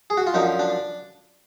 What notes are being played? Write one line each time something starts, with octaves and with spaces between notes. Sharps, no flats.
G#4
F#4
F4
F#2 D3 F3 D#4
D4